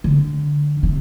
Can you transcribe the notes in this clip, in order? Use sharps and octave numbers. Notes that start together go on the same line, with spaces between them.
D3
C3